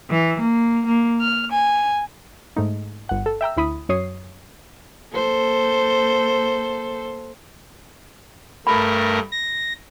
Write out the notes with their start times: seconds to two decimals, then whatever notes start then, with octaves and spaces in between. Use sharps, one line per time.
0.11 E3
0.40 A#3
0.87 A#3
1.21 F6
1.52 G#5
2.56 G#2 A3 D#4
3.09 G1 F#5
3.26 A4
3.41 E5 G5 A#5 E6
3.57 D2 E4 B5 D#6
3.89 F#2 F#3 C#5 D#6 C7
5.14 A#3 A4 C5
8.67 G2 A3 A#4 B5
9.32 A#6